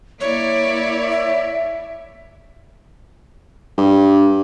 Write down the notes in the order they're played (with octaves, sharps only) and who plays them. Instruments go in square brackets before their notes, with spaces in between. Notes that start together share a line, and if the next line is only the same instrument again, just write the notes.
[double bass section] A#3 [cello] E4 D5 [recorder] C#5
[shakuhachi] E5
[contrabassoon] G2